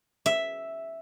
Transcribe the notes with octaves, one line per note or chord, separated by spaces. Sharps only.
E5